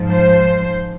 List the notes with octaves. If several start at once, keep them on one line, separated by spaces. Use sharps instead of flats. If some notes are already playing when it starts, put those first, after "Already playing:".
Already playing: G#2 F3
C5